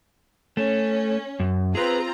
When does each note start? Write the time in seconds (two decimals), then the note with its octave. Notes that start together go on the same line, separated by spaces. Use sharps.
0.57 A3 C#4
1.40 F#2
1.75 C4 F4 G#4 B4 A#5